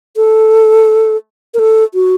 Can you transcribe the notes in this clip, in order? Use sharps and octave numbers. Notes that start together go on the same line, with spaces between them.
A4
A#4
A4
F#4